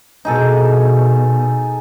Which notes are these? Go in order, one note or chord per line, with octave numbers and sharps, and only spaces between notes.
B2 D#4 G#4 A4